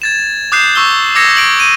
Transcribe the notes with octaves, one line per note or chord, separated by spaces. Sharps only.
G#6 A6 E7
D6 D#6 F#6 G6 C7 E7
C#6 E6 G7
D6 E6 G#6 A#6 C#7 E7
D7 F#7
D#7